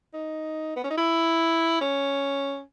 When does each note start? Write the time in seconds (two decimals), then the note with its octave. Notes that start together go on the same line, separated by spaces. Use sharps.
0.14 D#4
0.76 B3
0.84 C#4
0.90 D#4
0.97 E4
1.81 C#4